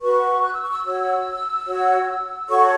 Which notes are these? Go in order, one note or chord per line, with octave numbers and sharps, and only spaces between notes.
F#4 B4 C#6
F#6
E6
C#6
E6
F#4 C#5 E6
F#4 C#5
F#4 A4 C#5 C#6